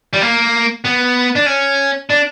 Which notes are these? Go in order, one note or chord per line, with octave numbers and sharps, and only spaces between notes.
G3
A#3
B3
D4
C#4
D4